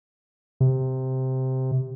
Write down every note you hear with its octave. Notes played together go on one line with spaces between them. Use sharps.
C3